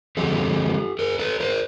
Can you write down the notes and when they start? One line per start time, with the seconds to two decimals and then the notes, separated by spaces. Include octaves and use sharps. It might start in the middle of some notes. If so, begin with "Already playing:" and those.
0.17 D3 F3 G#3 C4 G4 A4
0.99 G#4 A#4
1.19 A4 B4
1.40 A#4 C5